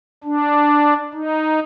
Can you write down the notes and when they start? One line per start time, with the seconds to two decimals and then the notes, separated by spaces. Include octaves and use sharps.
0.24 D4
1.14 D#4